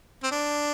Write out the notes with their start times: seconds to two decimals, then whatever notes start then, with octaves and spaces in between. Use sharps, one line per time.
0.23 C4
0.31 D4